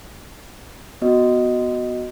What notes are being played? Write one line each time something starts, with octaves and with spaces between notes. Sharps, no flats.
B3 F#4 D#5